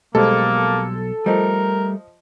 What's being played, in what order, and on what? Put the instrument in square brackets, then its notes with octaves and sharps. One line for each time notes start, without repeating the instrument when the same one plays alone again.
[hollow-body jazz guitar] B1 [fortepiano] G3 G#3 C5 [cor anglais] A#3 [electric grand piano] A4
[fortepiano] F3 D#5 [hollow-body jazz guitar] G3 A3 [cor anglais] A#4